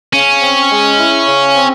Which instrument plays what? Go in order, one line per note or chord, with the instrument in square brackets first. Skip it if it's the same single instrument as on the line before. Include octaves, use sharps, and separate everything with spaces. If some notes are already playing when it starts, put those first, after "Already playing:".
[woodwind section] C#3 [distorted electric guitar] C#4
[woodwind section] C4
G#3
E4
C#3
C4